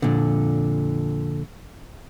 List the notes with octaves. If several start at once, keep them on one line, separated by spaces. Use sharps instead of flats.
F2 A#2 D3